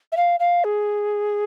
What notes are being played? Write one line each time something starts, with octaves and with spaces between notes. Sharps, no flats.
E5
F5
F5
G#4